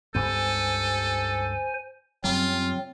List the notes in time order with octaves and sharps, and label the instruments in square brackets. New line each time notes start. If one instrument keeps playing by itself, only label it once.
[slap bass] C#2 G2 B3 [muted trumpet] A4 [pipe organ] C5 G#5
[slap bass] F#2 C#3 G3 [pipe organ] F#3 C4 [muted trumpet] F4